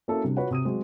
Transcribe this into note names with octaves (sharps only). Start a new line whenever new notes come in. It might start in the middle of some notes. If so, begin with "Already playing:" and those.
A#3 C#4 E4 F#4 A4
C3 G3 D4
F4 F#4 B4 C#5 F#5
C3 D#6 D#7
F#3 G#3 C4 F#4